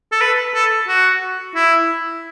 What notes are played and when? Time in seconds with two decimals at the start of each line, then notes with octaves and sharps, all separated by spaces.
0.12 A4
0.21 B4
0.55 A4
0.88 F#4
1.55 E4